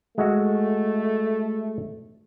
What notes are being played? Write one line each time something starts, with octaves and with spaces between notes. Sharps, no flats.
G#3 A3 F#4 E5